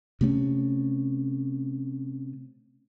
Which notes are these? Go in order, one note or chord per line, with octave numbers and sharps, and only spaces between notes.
C3 A3 C4 C#4